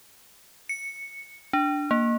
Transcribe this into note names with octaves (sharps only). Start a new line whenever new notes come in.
C#7
D4
A#3